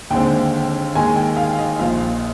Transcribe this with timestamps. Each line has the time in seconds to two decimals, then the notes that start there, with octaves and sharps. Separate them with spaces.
0.10 D#2 D3 G#3 C4 G5
0.95 D#2 D#3 G#3 G#5
1.16 G5
1.37 F5
1.59 D#5
1.79 A#1 A#2 F3 F5